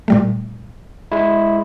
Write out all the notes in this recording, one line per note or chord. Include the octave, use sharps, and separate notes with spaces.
A#2 G3 A3
G#3 E4